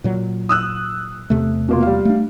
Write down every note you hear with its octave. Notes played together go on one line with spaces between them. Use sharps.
A#2 F#3
D#6 E6 F#6
E2 C3 A3
B2 A#3 F4
G3 F5
A3 D4